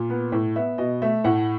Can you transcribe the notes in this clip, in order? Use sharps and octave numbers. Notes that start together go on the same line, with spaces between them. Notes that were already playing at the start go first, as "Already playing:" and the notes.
Already playing: A#2
B3
A2
B3 E5
B2 D#5
A3 E5
A2 F#5